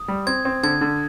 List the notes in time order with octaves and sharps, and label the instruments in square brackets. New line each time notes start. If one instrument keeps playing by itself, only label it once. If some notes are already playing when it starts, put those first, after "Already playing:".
Already playing: [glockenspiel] D#6
[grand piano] G3
[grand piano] C4 [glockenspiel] G#6
[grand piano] C4
[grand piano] D3 [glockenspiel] G#6
[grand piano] D3